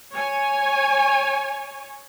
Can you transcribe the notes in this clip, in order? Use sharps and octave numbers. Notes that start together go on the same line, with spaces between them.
C#5 G#5